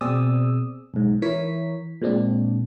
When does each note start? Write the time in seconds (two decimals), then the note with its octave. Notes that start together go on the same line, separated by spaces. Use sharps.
0.01 B2 C4 G#4 D5 D#6 E6
0.94 B1 G#2
1.22 E3 E4 A#4 C#5 B6
2.02 A#2 G#3 C4 D4